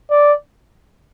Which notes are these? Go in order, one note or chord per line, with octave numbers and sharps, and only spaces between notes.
D5